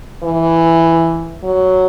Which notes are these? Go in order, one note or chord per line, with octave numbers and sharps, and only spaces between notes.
E3
F#3